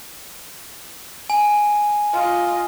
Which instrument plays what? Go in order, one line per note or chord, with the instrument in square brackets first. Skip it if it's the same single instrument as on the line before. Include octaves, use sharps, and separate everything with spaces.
[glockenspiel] G#5
[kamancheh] F4 D#5